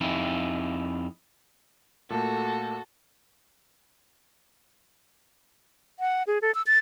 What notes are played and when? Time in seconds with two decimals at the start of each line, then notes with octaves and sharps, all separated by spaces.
0.01 F2 D#4 E4
2.10 A#2 A3 A#3 F#4 A4
6.00 F#5
6.27 G#4
6.42 A4
6.55 E6
6.67 A6